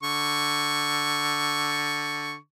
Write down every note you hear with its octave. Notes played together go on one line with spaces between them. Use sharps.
D3 C#6